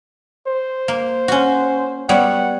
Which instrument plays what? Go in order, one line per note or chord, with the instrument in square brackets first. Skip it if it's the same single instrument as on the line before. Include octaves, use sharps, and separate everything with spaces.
[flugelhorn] C5
[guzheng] A#3
C#4 F#4
[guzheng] G3 B3 C#5 [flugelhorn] F#5